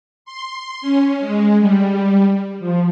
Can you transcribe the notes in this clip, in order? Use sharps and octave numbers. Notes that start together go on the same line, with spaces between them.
C6
C#4
G#3
G3
F3